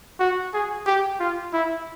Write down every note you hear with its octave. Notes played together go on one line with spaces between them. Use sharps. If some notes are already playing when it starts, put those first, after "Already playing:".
F#4
G#4
G4
F4
E4